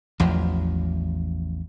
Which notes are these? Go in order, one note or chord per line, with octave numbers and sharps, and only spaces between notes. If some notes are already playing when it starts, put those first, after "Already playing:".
A1 E2 F3 F#3